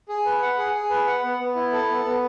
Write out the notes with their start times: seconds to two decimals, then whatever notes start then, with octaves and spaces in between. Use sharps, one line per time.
0.08 G#4
0.25 B4
0.42 F#5
0.58 G#4
0.74 G#4
0.90 B4
1.07 F#5
1.24 B3
1.40 B3
1.55 E4
1.72 A4
1.89 B3
2.05 B3